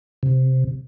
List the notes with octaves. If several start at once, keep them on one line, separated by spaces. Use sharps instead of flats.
C3